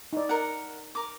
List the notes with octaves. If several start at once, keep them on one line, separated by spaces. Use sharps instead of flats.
D#4 D5
A#4 F#5
A#4 D6